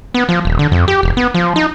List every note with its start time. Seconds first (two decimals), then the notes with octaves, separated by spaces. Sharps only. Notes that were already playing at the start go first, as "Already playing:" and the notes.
0.14 B3
0.29 F3
0.45 D#1
0.59 D3
0.72 F2
0.88 G4
1.03 E1
1.17 B3
1.34 F3
1.56 D#4